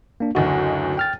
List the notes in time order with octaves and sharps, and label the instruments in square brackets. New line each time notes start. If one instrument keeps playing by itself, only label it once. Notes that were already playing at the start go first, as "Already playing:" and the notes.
[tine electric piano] A#3 D4
[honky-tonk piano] F#1 D2 D#4 [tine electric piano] F#4
[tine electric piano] G5 F6 A6